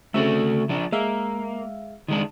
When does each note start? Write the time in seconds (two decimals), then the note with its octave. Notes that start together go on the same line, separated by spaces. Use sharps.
0.14 C#3 A3 C4 F#4 A4 E5
0.69 F3 D4
0.92 G#3 A#3 E5 F5
2.08 D#3 G#3 D4